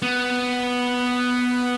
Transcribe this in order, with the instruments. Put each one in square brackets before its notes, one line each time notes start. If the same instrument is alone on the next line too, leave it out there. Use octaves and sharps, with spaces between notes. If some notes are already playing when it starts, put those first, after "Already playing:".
[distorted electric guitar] B3